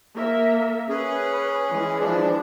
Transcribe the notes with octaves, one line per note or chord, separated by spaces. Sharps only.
A#3 A#4 E5
C#4 G#4 B4
E3 G#3
F3 D4